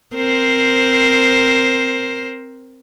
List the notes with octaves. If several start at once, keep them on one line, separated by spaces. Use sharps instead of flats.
C4 A#4 C5